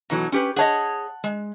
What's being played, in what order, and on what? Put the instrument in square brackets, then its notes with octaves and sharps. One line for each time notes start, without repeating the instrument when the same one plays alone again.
[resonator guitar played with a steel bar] B2 E3 F#3 [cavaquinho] D#4 A4
[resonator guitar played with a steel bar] C#4 G4 B4 [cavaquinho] C#6
[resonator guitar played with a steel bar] G#4 C#5 D#5 [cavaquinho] F#5 A5
[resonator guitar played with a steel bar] G#3